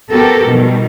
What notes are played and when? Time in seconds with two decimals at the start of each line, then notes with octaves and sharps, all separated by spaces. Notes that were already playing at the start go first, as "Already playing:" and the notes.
0.11 B3 F#4 G4 A4 A#4
0.47 B2 D#3 G3